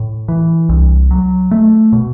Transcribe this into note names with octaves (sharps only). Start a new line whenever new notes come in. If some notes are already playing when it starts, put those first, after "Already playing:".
Already playing: A2
E3
C2
F#3
A3
B2